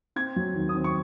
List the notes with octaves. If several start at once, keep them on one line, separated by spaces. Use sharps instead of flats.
C4 G#6
F#3
D#2
D#6
C4
C#6